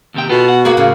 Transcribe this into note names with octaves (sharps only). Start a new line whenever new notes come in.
D#2 C3 G5
B2 B3 F4 A4
F#5
A#3 F#4 G#4 B5
A2 C#3